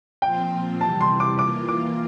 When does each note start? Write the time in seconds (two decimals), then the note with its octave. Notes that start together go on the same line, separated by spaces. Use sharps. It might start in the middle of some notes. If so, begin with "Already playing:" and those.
0.22 A#2 F3 C4 F4 G5
0.81 C3 E3 G3 A5
1.01 C6
1.20 D6
1.38 E3 A#3 F4 D6
1.69 D6